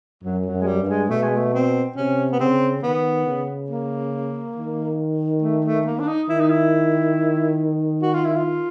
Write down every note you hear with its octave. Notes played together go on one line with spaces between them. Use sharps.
F#2 F#3
F#3
F#2
G#3
G3
G2
G#3
B2 A3
G#3
A3
C4
C3 C#4
B3
C#3 C4
D#3 B3
C#3
A#3
D#3
A3
A3
A#3
D4
D#4
D#3 E4
D#4
E4
F#4
F4
E4
F4